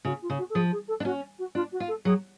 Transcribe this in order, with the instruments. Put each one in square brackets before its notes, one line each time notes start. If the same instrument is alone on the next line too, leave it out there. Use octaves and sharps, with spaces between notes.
[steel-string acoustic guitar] C#3 [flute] F#4
[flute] F4
[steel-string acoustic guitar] C#3
[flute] F#4
A4
[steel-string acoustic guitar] F3 [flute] G#4
[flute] G#4
A4
[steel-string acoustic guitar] D4
[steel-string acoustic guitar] C#4 [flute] F#4
[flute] F#4
[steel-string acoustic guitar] D4 [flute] F4
[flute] F#4
[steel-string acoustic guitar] F4
[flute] A4
[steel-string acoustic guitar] F#3 [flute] G#4